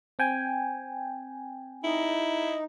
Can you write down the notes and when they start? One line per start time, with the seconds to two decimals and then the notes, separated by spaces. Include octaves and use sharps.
0.19 C4 G5 G#5
1.84 D#4 E4